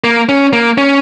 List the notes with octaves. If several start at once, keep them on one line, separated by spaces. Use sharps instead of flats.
A#3
C#4
A#3
C#4